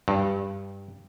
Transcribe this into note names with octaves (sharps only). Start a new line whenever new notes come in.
G2